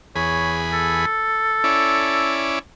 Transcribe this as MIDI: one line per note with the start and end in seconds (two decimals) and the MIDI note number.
0.16 1.05 40
0.16 1.05 68
0.16 0.59 73
0.16 1.05 83
0.73 2.52 69
1.64 2.59 61
1.64 2.59 64
1.64 2.59 74